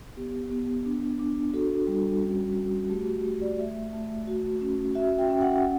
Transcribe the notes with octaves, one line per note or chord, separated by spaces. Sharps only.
B3 G4
B3
D4
D4
F#4 A4
G3
C#4
F#4
A3 G4
F#4
A3 G4
D5
A3 E5
A3
F#4
C#4
F#4 E5
G5
C#4 G5
F#5
F#5